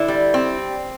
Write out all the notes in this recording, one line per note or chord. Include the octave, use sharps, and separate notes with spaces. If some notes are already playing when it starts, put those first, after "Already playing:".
Already playing: D3 E4
G3
C4